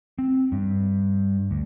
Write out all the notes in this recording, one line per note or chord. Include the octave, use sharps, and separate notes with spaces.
C4
G2
D2